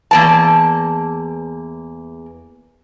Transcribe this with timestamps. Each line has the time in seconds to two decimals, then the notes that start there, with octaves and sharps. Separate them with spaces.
0.11 E2 A#3 A5